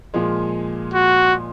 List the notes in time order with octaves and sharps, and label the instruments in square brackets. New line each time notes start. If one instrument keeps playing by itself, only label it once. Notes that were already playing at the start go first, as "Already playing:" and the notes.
[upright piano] A#2 F3 G#3
[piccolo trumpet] F#4